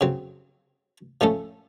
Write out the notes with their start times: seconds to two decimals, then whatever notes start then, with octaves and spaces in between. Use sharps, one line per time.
0.01 C#3 F#3 C4
1.21 A2 F3 A3 C#4 A4